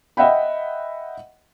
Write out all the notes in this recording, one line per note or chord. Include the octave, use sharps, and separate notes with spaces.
D#5 E5 F#5 G5 B5